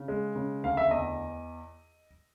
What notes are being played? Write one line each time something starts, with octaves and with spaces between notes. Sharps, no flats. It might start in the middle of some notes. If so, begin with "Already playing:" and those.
Already playing: C#3
G#3
C#3
D2 F5
E5
E2 D#5